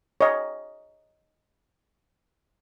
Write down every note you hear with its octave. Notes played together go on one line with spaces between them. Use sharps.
C#5 D#5